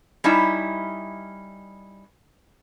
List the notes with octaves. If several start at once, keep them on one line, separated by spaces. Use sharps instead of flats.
G3 C#4 D#4 E4 E5